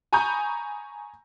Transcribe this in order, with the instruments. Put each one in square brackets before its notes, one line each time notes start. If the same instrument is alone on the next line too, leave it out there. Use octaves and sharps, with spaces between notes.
[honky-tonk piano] G#5 A#5 B5 C#6 D#6 G6